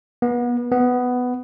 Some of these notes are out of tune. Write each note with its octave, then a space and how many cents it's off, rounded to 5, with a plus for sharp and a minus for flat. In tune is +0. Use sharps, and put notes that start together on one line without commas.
B3 -30
B3 +10